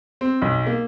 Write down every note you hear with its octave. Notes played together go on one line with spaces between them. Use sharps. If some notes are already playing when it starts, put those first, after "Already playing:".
C4
B1
A#3